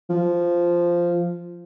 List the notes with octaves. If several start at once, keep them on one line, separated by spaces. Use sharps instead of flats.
F3